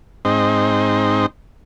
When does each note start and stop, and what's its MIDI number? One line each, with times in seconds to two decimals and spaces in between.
0.25 1.26 44
0.25 1.26 60
0.25 1.26 63